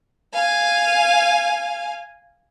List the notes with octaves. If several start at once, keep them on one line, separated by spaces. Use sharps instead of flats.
F5 G#5